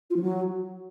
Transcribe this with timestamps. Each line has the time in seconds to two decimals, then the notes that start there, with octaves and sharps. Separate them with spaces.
0.10 F4
0.16 F3
0.21 F#3